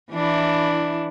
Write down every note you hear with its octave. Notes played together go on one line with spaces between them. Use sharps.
E3 D4 E4